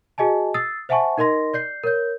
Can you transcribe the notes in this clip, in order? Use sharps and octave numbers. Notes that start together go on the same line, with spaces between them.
F#4 G#4 D#5 G#5 A5
D#6 E6 A6 C7
C5 E5 F#5 G#5 A5 C#6
D#4 A#4 D#5 C6 A#6
D5 G6 C7
A#4 C#5 G6